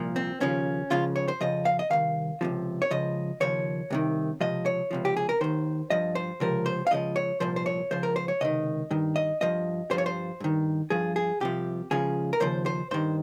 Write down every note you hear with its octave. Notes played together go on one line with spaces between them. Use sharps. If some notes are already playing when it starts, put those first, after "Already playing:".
Already playing: C2 A#2 F3
C4
D#2 C#3 F3 C#4
C#2 C#3 F3 F4
C#5
C5
F2 C#3 F3 D#5
F5
D#5
C2 C3 D#3 F5
C#2 C3 F3
C#5
C#2 C#3 F3 D#5
D#2 C#3 F3 C#5
C2 C3 D#3
C#2 C3 F3 D#5
C#5
C#2 C3 F3
G4
G#4
A#4
D#2 D#3 C5
G2 F3 D#5
C5
C#2 C3 F3 A#4
C5
F5
C#2 C#3 F3 D#5
C#5
C2 A#2 F3 C5
C5
C#5
C#2 C#3 F3 C5
A#4
C5
C#5
C#2 C3 D#3 D#5
G2 D#3
D#5
G2 F3 D#5
G2 F3 C5
C#5
C5
G2 D#3
G2 F3 G#4
G#4
C2 C3 F3 G4
C#2 C#3 F3 G#4
A#4
D#2 C#3 F3 C5
C5
G2 D#3 C5